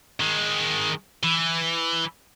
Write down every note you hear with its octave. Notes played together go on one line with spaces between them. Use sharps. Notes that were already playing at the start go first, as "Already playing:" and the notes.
D#3 G#3
E3